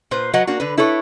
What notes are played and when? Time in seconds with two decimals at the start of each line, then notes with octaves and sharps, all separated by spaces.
0.11 A#2 B4 C5
0.34 F#3 B4 D#5 F#5
0.47 A#3 D4 F#4
0.60 D3 B4
0.78 E4 A4 B4 C#5